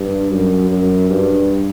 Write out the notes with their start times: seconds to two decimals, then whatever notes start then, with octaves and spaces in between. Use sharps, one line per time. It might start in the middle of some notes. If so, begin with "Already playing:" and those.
Already playing: G2
0.31 F#2
0.70 F#2
1.10 G2